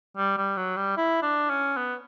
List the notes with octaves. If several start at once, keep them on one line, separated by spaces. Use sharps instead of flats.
G3
G3
F#3
G3
E4
D4
C#4
B3